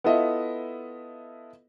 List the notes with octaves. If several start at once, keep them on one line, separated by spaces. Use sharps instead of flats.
B3 E4 F4 A4 D#5 E5